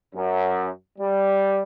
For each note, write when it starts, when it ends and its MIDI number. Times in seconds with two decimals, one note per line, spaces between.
0.15 0.67 42
0.99 1.62 55